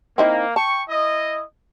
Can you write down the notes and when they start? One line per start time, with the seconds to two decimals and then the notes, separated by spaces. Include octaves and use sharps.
0.18 A#3 C4 D#4 E4
0.56 G5 A5 C#6
0.89 E4 D#5